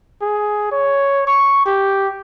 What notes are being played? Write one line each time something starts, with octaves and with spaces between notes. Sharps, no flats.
G#4
C#5
C#6
G4